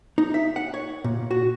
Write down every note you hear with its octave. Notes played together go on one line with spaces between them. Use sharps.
D#4
E5
F#5
C#5
A#2
F#4